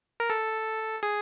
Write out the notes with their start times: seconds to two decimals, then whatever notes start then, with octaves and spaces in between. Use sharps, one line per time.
0.20 A#4
0.30 A4
1.03 G#4